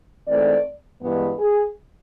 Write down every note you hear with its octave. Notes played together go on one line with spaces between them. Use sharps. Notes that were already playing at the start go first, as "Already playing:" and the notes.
G#2 E3 A3 C4 D5
G2 E3 G#3 B3
G#4